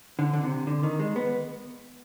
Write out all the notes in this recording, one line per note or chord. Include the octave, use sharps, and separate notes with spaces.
D3
D3
C3
D3
D#3
G#3
B3